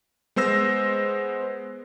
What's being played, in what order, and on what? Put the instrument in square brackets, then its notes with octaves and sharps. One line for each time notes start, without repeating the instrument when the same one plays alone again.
[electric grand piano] G#3 B3 C5 E6 A#6